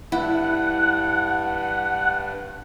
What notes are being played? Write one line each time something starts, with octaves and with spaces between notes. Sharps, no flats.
G2 E4 F#5